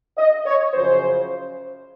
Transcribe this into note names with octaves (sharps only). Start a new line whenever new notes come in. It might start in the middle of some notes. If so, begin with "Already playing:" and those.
D#5
C#5
F#2 C#3 F3 C5